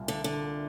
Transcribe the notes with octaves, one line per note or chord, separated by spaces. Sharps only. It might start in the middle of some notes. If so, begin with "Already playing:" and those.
Already playing: C2 A#2 G3 A#3 F4
D3
D3